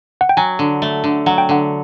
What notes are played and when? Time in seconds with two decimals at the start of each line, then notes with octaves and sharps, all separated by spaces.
0.21 F#5
0.29 G5
0.37 F#3 G#5
0.59 D3
0.82 A3
1.04 D3
1.26 F#3 F#5
1.38 G5
1.49 D3 F#5